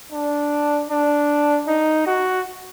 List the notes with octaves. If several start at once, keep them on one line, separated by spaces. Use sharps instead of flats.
D4
D4
D#4
F#4